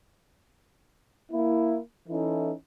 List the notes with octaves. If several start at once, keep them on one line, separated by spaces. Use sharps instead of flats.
A#3 E4
E3 C#4 D#4 E4 A4